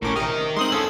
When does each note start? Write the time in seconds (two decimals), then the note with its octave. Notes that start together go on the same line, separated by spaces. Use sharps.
0.02 A#1 A2 C#4 A#4 D6
0.16 C3 G4 A#4 D#5 F6
0.57 G#3 C4 D#4 C6 D#6 F#7
0.72 C#4 F4 A4 E6